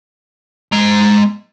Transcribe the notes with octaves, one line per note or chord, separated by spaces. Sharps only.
G#3 A#5